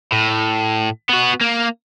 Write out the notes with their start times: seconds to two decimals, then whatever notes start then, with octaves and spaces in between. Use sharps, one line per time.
0.12 A2
1.09 B3 F#4
1.41 A#3